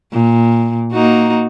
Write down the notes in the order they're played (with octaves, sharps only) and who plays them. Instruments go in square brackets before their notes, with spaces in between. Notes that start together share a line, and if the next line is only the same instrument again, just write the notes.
[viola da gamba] A#2
A#3 D#4 F#4